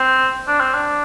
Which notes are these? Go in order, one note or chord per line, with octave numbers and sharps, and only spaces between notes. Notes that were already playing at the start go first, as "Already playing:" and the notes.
Already playing: C4
D4
C4
D4